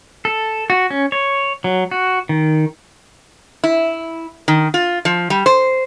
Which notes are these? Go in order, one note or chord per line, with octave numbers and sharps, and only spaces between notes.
A4
F#4
C#4
C#5
F#3
F#4
D#3
E4
D#3
F4
F3
G3
C5